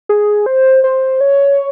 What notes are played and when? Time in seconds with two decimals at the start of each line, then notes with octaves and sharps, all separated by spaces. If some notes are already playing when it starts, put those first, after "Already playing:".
0.09 G#4
0.46 C5
0.84 C5
1.21 C#5